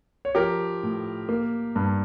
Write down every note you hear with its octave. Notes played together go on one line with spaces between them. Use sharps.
C#5
F3 G4 A#4
A2
A#3
G2